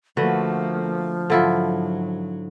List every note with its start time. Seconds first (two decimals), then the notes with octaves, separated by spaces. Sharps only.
0.17 D3 F3 A3 A#3 F#4 B4
1.30 G#2 D3 F#3 E4 F4